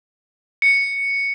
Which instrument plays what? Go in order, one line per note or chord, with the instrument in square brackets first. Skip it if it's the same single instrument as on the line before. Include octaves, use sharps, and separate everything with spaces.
[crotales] C#7